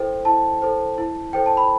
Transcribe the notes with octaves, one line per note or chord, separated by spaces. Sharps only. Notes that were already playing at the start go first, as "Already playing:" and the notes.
Already playing: E4 A4 C5 G5
E4 A5
A4 C5
E4
A4 C5 G5
A5
B5